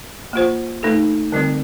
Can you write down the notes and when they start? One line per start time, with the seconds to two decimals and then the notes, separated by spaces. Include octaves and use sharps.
0.33 A#3 F4 C5
0.83 A3 D#4 A4
1.32 D3 G3 C4